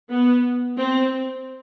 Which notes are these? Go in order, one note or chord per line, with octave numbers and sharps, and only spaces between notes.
B3
C4